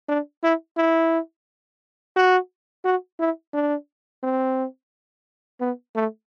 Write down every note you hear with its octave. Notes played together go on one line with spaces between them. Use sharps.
D4
E4
E4
F#4
F#4
E4
D4
C4
B3
A3